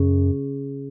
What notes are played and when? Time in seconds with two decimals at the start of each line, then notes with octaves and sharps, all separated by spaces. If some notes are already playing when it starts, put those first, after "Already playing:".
Already playing: F#2 C#3